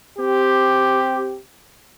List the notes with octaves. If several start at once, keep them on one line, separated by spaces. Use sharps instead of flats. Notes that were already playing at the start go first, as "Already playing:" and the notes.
C4 G4